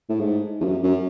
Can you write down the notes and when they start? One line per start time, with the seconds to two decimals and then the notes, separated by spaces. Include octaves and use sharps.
0.09 A2
0.20 G#2
0.60 E2
0.64 F#2
0.83 F#2